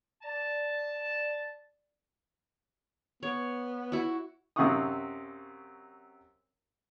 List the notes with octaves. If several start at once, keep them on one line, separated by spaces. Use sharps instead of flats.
D5 A5
B3 C#5
E4 F#4
F#2 C3 F5 F#5 C#6 D#6